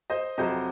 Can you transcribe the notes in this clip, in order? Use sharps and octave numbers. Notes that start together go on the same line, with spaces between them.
C5 D#5
F2 C3 F#3 C5 D#5